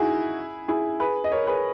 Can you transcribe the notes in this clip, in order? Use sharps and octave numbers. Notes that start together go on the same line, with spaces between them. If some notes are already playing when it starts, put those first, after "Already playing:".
Already playing: D#4 E4 F#4 G#4
E4 G#4
G#4 B4
D#5
A#4 C#5
G#4 B4